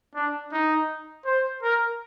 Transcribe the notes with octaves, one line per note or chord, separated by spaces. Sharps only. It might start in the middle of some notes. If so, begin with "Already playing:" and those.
D4
D#4
C5
A#4